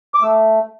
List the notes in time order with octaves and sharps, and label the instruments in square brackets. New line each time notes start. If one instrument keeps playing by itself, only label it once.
[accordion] D6
A3 E6